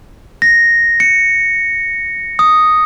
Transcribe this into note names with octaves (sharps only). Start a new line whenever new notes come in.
A#6
C#7
D#6